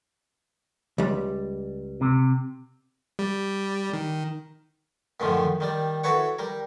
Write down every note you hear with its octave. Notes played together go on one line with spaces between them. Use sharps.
C#2 G3
C3
G3
D#3
F#2 A2 D3 D#3 F3
D#3 G3 D5
E4 F#4 A4 B4 C#5 F#5
G3 A#4